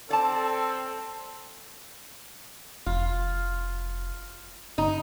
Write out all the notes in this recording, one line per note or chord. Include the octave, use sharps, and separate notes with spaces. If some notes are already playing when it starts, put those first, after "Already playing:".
C4 A4 D5 A5
F1 F4
G1 D#4